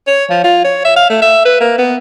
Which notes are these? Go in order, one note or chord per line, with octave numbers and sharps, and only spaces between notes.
C#5
F3
F4
C#5
E5
F5
A3
E5
B4
A#3
B3